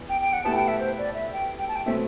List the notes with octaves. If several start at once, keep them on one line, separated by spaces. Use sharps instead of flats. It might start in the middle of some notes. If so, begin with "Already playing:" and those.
Already playing: E2
G5
G5
F#5
B2 A3 E4 G4 B4 A5
G5
E5
C5
D5
E5
G5
G5
A5
G5
B2 F#3 A3 C4 E5